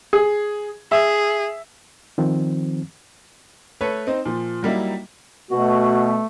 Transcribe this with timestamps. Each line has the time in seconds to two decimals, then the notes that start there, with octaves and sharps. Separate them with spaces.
0.13 G#4
0.92 G#4 E5
2.18 D#3 F3 C4
3.81 A3 A4 B4 C#5
4.07 C4 D#4 C5
4.25 A#2 F3
4.63 F#3 G3 A#3 D#4 E4
5.51 B2 A3 F#4